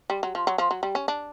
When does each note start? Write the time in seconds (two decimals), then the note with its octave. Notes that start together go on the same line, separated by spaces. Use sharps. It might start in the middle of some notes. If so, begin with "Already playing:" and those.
0.10 G3
0.23 F#3
0.35 F3
0.47 F#3
0.58 F3
0.71 F#3
0.83 G3
0.95 C#4
1.08 D4